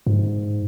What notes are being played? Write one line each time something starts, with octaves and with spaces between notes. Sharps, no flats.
G#2